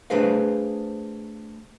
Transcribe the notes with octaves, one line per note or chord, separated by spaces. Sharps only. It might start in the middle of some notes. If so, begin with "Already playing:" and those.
A3 D4 G#4 B4 C5 F5